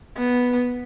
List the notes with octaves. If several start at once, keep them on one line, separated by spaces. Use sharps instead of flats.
B3